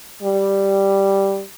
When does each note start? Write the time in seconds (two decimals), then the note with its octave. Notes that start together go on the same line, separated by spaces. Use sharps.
0.21 G3